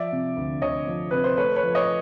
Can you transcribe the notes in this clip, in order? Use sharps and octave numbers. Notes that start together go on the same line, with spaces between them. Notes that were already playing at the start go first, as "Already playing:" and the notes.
Already playing: F3 D5 E5
C3
D2
D2 C#5 D#5
F3
C3 B4
C5
A3 B4 C#5
B4 C#5
F3
C#5 D#5